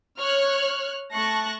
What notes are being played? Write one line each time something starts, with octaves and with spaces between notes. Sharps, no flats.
C#5 F6 F#6
A3 A5 C#6 F#6 A#6